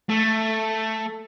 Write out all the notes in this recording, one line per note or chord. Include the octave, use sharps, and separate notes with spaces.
A3